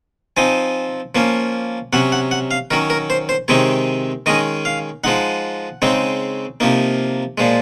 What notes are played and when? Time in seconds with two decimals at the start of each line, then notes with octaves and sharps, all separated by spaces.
0.37 F3 C4 D#4 G#5
1.15 F3 A#3 C#4
1.93 C3 F#3 C#4 F#5
2.12 F#5
2.31 F#5
2.51 F5
2.71 D#3 F#3 C#4 A#4
2.90 A#4
3.10 C5
3.29 C5
3.48 C3 D#3 G#3 C4 D#4 C#5
4.26 D#3 G#3 C#4 D#5
4.65 F5
5.04 F3 G#3 D#4 F#5
5.82 C#3 G#3 C4 D#4
6.60 C3 F3 A#3 D#4
7.38 A#2 F3 G#3